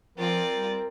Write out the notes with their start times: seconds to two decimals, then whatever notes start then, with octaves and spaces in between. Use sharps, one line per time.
0.18 F3 C4 F4 A#4 D5
0.53 G3